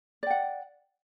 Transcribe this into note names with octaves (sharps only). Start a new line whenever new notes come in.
D5 F#5 G5